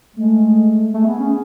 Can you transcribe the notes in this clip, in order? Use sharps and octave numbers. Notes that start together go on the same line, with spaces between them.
G#3 A3
A3 G#4
B3
C#4